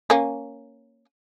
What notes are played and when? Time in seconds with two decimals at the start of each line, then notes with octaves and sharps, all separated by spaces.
0.10 A#3 C#4